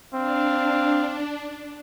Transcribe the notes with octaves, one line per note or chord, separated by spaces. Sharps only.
C4 D4 F5